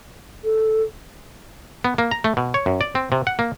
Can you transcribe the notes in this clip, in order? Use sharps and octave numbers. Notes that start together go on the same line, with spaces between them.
A4
B3
A#3
A#5
A3
B2
C#5
F#2
D5
C4
C3
F#5
A#3